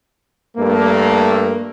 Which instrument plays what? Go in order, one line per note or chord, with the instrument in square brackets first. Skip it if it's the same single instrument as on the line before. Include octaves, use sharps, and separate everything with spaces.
[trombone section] G2 A3 A#3